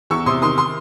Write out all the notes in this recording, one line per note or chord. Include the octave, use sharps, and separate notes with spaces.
E2 C#6 E6
C3 C6 D#6
D#3 C6 D#6
C6 D#6